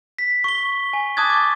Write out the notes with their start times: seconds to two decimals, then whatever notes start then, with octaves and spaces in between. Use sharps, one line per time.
0.19 B6
0.44 C#6 G7
0.93 G#5
1.17 A5 D6 D#6 F#6 G#6 A6
1.30 C#6 D6